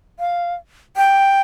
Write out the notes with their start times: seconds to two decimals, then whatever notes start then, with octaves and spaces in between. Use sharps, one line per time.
0.19 F5
0.97 G5